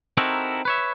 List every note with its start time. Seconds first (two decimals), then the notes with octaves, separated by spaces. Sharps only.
0.17 C4 D#4 E4 F#4 A4 A#4
0.65 B4 C#5 E5